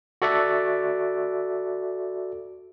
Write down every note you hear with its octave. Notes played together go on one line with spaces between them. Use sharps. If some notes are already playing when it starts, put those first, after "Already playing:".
F#4 A4 D5 E5 F#5